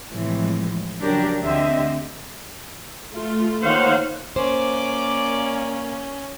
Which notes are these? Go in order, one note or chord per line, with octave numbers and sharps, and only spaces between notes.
A2 C3 E3 F3 G#3
C#3 F3 F#3 D4 G4 A#4
D2 D3 C4 G4 D#5 E5
A3 F4
D#3 A#3 C5 C#5 F5 F#5
A#3 C#4 C5 D5 D6